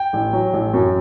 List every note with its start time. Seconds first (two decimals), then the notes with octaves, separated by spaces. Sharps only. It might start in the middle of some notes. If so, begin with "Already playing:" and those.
Already playing: G5
0.13 A1
0.33 F#3
0.53 A1
0.74 F#2